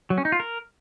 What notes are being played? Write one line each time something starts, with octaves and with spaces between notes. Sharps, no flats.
F#3
C#4
D#4
F4
A#4